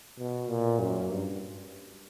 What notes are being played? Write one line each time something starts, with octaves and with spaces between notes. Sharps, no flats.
B2
A#2
F#2
G2